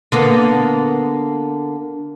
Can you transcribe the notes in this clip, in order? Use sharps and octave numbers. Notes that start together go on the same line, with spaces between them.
D3 A#3 B3